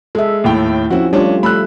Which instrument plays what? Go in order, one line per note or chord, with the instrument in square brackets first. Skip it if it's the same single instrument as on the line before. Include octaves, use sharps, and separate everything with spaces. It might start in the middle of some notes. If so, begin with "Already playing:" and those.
[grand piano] G#3 [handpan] A4 E5
[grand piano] D#2 A2 G5
[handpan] F3 C4 C#4 [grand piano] E4 F#4
[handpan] G3 A3 F4 [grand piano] C#4 D4
[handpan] A3 [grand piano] B5 E6 F#6